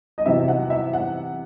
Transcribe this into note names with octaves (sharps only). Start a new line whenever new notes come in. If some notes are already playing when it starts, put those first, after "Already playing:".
D#5
E2 C3 F#3 E5
F#5
E5
F#5